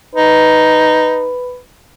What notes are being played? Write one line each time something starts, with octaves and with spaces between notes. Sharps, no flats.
D#4 B4